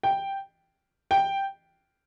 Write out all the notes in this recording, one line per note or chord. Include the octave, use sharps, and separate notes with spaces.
G5
G5